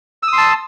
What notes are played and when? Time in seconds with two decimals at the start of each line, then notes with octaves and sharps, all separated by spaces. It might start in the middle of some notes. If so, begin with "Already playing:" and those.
0.23 E6
0.28 D#6
0.33 C6
0.38 A5